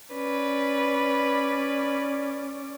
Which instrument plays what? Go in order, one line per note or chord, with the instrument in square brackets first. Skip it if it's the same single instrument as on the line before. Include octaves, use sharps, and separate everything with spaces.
[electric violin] C#4 D5 [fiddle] B4